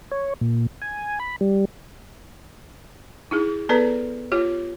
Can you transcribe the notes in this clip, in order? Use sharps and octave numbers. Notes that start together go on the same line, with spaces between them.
C#5
A#2
G#5
B5
G3
D#4 E4 G#4
B3 A4 B4 D5 A#5
F4 G4 C#5